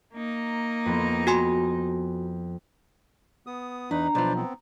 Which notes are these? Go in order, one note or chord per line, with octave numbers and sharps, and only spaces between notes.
A#3 D#4
F2 B3
F#4 G#5 C6
B3 D#6
E2 D4 D#4 B4 A#5 B5
B1 F3 B4 C5 D5
B3 C4